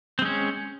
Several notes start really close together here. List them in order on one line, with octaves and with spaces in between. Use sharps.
C4 G#3 C#4